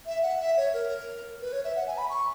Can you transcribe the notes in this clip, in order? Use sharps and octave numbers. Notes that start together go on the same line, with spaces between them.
E5
F#5
E5
C#5
A#4
B4
C#5
E5
F#5
G#5
B5
C#6